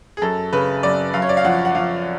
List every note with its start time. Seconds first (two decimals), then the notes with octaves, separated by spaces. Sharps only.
0.17 G#4
0.22 F#2 A4
0.53 C#3 B4
0.83 F#2 D5
1.14 F#2 F5
1.22 C#5
1.29 D5
1.37 F5
1.45 F3 F#5
1.65 F#5
1.75 F3 F5